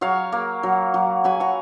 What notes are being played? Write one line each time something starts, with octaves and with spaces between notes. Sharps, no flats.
F#3 C#5 F5
A#3
F#3
F#3
F#3 G#5 B5
F#5 A#5